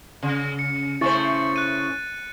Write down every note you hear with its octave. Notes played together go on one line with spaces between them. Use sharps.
C#3
C#7
C#3 A3 E4 C5 C#6 A6
F#6 D#7